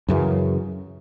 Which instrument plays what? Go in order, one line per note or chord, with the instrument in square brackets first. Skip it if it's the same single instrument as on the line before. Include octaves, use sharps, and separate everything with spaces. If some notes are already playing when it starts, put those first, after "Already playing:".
[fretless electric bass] F#2 C#3 E3